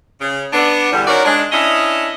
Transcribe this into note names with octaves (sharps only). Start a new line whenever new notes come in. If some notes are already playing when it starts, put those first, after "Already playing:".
C#3
B3 D4
E2 D3 G3
D#3 C#4 F#4 A#4 D5
G#3 D4
C#4 D4 E4 D#5